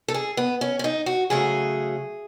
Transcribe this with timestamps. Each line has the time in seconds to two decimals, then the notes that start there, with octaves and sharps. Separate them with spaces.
0.08 A4
0.14 G#4
0.37 B3
0.61 C#4
0.79 C#4
0.84 D#4
1.06 F#4
1.30 C#3 F#3 A3 G#4